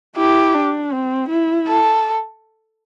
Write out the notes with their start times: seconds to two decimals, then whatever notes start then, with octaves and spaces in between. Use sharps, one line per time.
0.17 E4 G4
0.55 D4
0.92 C4
1.29 E4
1.68 A4